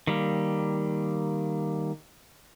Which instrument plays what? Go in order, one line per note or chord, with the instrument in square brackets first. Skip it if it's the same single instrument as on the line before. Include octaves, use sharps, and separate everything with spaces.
[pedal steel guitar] D#3 G3 A#3